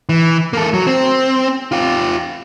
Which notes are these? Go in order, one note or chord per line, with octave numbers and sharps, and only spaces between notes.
E3
A#3 A4
F#3
C4
F4 G4